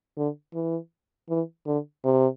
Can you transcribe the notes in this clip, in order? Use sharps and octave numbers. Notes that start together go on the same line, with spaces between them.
D3
E3
E3
D3
C3